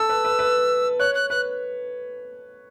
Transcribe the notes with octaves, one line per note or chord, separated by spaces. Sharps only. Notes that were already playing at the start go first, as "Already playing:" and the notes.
Already playing: A4 E6
B4
B4
B4
C#5 F#6
F#6
B4 F#6